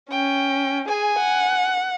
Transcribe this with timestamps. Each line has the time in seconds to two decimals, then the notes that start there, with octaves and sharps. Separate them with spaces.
0.11 C#4 G5
0.88 G#4 G#5
1.18 F#5